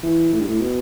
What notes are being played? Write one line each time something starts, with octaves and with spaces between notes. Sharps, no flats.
E3
A2
G2
A2
B2